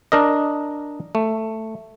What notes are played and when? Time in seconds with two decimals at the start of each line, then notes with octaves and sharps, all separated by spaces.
0.12 D4 A#4 D#5
1.15 A3